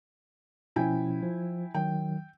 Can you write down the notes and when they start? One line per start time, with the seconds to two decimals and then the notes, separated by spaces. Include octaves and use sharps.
0.76 B2 F3 C#4 E4 G5 G#5
1.23 F3
1.74 D#3 F#3 G5